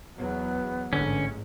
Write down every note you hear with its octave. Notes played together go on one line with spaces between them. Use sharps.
E2 F#3 B3
A1 G#2 D3 C#4